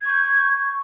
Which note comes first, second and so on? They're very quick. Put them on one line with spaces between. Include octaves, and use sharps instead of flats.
G#6 C#6 G6